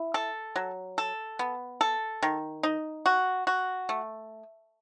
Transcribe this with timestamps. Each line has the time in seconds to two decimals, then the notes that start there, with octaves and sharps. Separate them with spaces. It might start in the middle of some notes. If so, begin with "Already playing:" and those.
Already playing: E4
0.14 A4
0.56 F#3
0.98 A4
1.39 B3
1.81 A4
2.23 D#3
2.63 D#4
3.06 F#4
3.47 F#4
3.89 A3